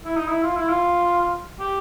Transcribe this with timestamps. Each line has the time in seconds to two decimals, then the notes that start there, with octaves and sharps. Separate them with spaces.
0.05 E4
0.16 D#4
0.28 E4
0.43 F4
0.57 E4
0.69 F4
1.60 G4